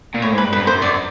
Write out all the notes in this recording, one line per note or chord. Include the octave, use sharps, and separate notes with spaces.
A#2
A2 C#5
G#2 B4
G2
B4
G2
F#2 C5
F#2 D5